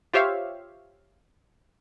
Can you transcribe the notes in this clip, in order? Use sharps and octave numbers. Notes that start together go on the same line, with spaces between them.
F4 G4 C5 C#5 E5 F5